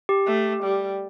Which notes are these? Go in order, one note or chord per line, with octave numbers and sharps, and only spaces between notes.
G4
A3
G3